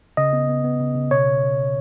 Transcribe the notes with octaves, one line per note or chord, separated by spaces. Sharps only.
C#3 D#5
B3
B3
B3
C#3
C#3
B2 C#5